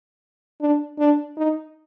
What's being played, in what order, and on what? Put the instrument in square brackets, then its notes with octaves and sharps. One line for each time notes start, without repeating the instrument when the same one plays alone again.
[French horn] D4
D4
D#4